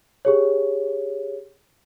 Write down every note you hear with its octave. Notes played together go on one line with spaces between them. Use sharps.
G4 G#4 C#5